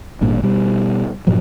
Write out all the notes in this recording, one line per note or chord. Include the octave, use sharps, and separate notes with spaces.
G#1 G2 A#2
B2 G3
G2 A#2 F3 F#3